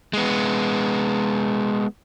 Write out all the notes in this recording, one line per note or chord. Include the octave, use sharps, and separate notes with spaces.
G#3 B3